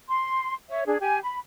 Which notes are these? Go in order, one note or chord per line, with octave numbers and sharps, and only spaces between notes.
C6
C#5 E5
D4 G#4
G4 G#5
B5